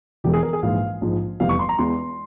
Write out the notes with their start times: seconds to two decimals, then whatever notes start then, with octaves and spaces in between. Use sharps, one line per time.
0.24 E1 E2 E3 G#3 G4
0.34 G#4
0.43 A#4
0.53 G#4
0.63 A#1 G#2 E3 G#3 F5
1.01 A#1 G#2 F3 G#3
1.40 F1 E2 E3 G3 F5
1.49 C#6
1.59 C6
1.69 A#5
1.78 E2 E3 G#3 C6